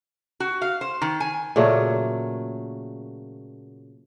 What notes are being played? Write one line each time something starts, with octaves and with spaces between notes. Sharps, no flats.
F#4
F5
C5
D#3
G#5
A#2 C#3 F#3 A3